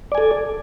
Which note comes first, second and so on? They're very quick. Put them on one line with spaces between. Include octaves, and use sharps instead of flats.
D5 G#5 A4